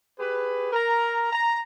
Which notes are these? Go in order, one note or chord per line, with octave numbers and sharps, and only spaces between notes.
G4 G#4 B4
A#4 A#5
A#5